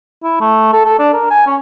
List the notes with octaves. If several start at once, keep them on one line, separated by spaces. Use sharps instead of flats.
E4
A3
A4
A4
D4
A#4
G#5
C#4